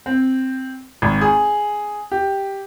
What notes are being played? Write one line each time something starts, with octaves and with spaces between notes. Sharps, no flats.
C4
G#1
G#4
G4